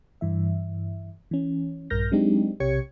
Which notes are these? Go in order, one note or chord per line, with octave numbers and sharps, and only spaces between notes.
G2 E3 E5
E3 C#4
A#1 G2 A#4 F6 G6 A#6
F#3 G#3 C4 D4 D#4 G4
B1 C3 G4 C#5 G#6 C#7